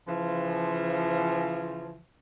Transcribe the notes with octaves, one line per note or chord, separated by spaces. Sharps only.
C#3 E3 F3